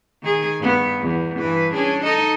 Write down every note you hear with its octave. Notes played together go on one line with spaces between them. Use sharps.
D#3 G#4
G2 B3
E2
G2 E3 B4
C#4 D4 G#4
D#4 A4 D#5